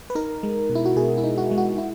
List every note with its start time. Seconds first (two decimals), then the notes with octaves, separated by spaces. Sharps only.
0.10 B4
0.15 D#4 A#4
0.43 G#3
0.70 B2
0.75 E4
0.85 F#4
0.96 B2 G#4
1.17 E4
1.24 D#4
1.38 F#4
1.51 G#3
1.58 F#4
1.78 E4